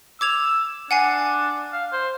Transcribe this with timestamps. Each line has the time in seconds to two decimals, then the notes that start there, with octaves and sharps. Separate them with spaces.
0.21 D6 E6 G#6 F7
0.91 D4 F#5 G#5 C7
1.73 F5
1.93 C5